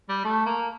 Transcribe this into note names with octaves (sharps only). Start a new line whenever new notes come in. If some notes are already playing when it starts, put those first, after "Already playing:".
G3
A3
A#3